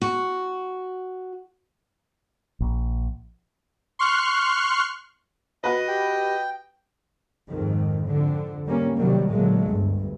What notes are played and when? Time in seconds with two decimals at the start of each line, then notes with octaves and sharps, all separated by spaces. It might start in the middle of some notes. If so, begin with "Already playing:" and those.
0.02 F#4
2.60 A#1
3.99 C6 C#6 F6 F#6
5.64 F#4 B4 D#5
5.88 G4 G5
7.50 F2 G#2 D#3
8.07 F2 D3
8.67 G3 A#3 C#4
8.96 C3 D#3 F#3 G3 A#3
9.31 A#2 D3 F#3 G#3 A3
9.66 G1 D2 G2